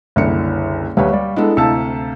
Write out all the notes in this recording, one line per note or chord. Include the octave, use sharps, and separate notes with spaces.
F#1 C2 D3 E4 C#7
D2 F#3 G3 B4 C#5 F5 C#6
G3 D5
G#3 B3 D4 E4 A4 D#5
D2 C3 F5 A5 A#5 E6 B6 C#7